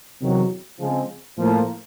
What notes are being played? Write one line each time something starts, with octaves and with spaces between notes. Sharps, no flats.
E2 C3 D#3 F#3
C#3 F3 G#3 C4
A2 F3 A#3